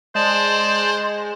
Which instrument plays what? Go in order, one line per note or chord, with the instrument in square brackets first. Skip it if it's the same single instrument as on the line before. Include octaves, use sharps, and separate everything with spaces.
[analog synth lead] G#3 [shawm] C5 [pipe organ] D5 A5